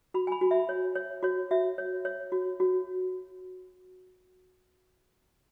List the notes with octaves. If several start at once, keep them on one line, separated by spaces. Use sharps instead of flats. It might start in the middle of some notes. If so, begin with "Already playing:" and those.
F#4 B5
G#5
B5
F#4
E5
C#5
C#5
F#4 C#5
F#4 E5
C#5
C#5
F#4
F#4